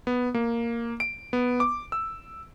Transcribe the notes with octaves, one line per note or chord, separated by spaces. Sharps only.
B3
A#3
D7
B3
D6
E6